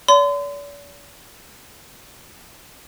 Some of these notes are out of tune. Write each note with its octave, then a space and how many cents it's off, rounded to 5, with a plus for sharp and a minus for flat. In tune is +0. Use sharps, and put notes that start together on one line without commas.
D5 -45 C6 -40